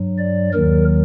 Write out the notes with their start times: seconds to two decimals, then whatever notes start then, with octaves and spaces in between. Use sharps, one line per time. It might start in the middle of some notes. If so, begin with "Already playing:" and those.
Already playing: G2 F#3
0.18 D5
0.53 D#2 D#3 F#3 A#4